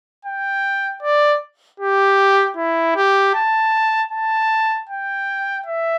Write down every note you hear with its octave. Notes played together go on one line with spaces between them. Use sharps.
G5
D5
G4
E4
G4
A5
A5
G5
E5